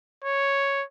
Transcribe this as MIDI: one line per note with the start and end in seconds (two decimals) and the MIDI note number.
0.25 0.84 73